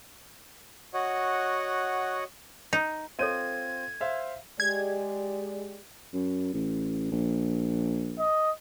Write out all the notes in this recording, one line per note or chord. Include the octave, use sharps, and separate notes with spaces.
F#4 C#5 D#5 F#5
D#4
C4 F4 A4 C#5 D#5 G#6 D#7
C5 E5 F5
G#3 G4 D5 G#6
F#2
A1
A#1
D#5